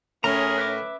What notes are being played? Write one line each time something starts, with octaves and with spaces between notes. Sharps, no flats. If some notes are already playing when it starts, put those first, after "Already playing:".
A2 C#4 G#4 A#4 A#5
B4 E5 D6